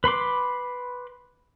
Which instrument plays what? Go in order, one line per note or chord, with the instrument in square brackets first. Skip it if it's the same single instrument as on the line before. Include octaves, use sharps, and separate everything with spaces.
[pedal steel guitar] B4 B5 C6 D6